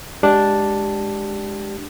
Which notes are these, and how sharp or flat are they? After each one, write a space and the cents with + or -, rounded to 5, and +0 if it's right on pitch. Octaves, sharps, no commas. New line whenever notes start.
G#3 +0 D4 +0 G4 -5